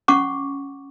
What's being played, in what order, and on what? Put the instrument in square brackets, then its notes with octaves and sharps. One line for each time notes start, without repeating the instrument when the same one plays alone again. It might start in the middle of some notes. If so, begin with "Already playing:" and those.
[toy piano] C#4 F#5 C#6 D6